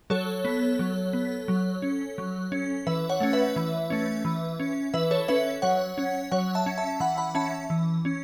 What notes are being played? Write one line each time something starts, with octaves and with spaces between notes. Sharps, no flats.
F#3 A4 C#5
B3
F#3
B3
F#3
C#4
F#3
C#4
E3 B4 E5
C#5 F#5
A3 C#4
B4 E5
E3
A3 C#4
E3
C#4
E3 B4 E5
A4 C#5
C#4 B4 E5
F#3 C#5 F#5
C#4
F#3 C#5 F#5
E5 A5
C#4
E5 A5
E3 F#5 B5
F#5 B5
C#4 E5 A5
E3
C#4